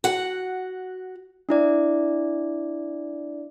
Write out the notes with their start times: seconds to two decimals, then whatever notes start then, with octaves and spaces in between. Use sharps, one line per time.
0.04 F#4 F#5
1.49 D4 E4 D5